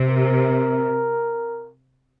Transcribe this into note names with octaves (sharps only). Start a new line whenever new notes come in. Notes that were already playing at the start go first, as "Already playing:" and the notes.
Already playing: C3
A#4